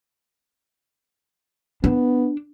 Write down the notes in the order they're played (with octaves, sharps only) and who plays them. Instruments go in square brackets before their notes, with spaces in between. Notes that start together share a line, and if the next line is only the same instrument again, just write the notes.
[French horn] B3 [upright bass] D4